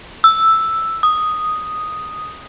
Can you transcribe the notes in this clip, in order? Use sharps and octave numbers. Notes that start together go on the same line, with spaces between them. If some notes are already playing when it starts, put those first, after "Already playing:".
E6
D#6